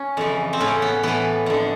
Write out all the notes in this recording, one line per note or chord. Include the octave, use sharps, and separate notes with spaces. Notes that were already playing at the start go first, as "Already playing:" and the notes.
Already playing: C#4
F2 C#3 E3
C4
A2 E3 C#4
B3
A2 E3 B3
F2 D3